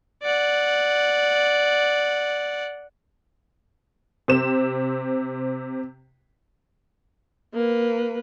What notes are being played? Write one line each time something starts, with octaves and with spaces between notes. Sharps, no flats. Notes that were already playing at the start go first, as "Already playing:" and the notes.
D5 F#5
C3 C4 E7
A#3 B4